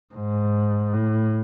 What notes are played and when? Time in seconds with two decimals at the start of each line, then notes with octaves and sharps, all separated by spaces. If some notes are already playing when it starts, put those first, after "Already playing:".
0.14 G#2
0.93 A2